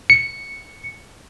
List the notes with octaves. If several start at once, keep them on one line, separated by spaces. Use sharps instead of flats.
C#7